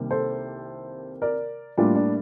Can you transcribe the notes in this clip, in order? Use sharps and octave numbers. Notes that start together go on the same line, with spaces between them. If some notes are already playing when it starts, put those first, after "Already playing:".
Already playing: C2 C3 D#3 G3 A#3
A4 C5
A#4 D5
A2 G3 A#3 D4 F4
D4